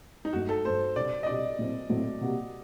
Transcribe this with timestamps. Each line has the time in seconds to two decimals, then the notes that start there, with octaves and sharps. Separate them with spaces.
0.25 D#4
0.33 G2 F#3 A3 F#4
0.49 A4
0.65 G2 F#3 A3 C5
0.96 C3 G3 D4 F#4 D5
1.23 D#5
1.26 C3 G3 D4 F#4 D5
1.59 A2 F#3 A3 C4
1.89 A2 F#3 A3 C4
2.21 C3 G3 A#3 F#4